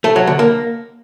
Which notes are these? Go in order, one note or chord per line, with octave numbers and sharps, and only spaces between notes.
A3
F#3
D3
A#3